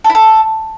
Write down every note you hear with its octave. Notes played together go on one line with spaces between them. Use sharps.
A4
E4
A4